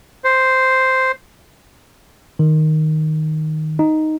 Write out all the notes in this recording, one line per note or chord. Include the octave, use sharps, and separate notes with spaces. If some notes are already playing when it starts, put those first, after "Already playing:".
C5
D#3
D#4